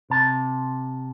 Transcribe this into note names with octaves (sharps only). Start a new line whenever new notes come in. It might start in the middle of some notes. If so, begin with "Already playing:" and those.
C3 A5